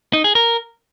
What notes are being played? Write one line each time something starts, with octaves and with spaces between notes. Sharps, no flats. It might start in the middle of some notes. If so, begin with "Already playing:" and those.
D#4
G#4
A#4